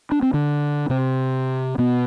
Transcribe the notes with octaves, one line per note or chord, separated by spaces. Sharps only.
D4
C4
D3 D4
C3 C4
B2 B3